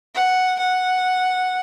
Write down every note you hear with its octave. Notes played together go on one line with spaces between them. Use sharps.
F#5
F#5